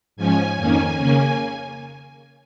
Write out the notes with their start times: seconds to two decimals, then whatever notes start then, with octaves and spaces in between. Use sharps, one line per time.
0.17 G#2 F3 C#4 G#5
0.57 F2 D#3 A#3 C#4 G#5
0.97 C#3 A#3 C#4 G#5